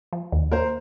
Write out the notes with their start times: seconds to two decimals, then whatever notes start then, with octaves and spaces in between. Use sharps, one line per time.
0.13 F3
0.32 D#2
0.51 A#3 A#4 C5